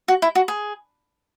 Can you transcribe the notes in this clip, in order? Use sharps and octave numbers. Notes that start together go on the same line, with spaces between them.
F#4
E4
F#4
G#4